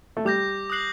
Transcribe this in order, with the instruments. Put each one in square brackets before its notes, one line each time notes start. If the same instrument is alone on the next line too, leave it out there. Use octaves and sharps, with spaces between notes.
[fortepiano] A3
[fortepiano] G3 [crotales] D6 G6 A#6
[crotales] D#6 F#6 C7 F#7